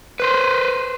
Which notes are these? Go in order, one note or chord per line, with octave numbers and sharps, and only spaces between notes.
B4 C5